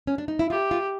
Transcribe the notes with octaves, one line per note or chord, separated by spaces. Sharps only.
C#4
D4
D#4
E4
F4 G4
F4